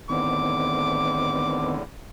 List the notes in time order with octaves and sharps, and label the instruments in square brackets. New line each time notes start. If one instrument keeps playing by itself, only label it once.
[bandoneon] E2 A2 D3 [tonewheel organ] D#3 B3 C4 [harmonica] D6